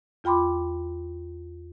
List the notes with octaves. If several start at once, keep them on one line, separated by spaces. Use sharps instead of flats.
E2 F4 G5 B5 C6 D6